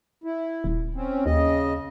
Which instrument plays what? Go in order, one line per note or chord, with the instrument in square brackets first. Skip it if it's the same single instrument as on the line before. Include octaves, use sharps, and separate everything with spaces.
[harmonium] E4
[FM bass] D#1
[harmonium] C4 C#4
[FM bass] D#2 [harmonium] C#3 D#5